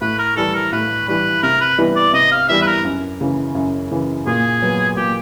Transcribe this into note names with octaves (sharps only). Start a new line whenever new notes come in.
A2 B4
A#4
E3 G3 A4
A#4
A2 B4
E3 G3 B4
C3 A#4
B4
E3 G3 B3 E4
D5
C3 D#5
F5
E3 G3 B3 E4 E5
B4
A#4
F#2
C#3 E3
F#2
C#3 E3
A#2 G#4
F#3 B3
A#2 G4